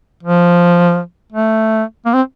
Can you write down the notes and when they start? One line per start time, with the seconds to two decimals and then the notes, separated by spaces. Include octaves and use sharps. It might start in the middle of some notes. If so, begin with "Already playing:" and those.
0.23 F3
1.33 A3
2.06 A#3
2.14 C4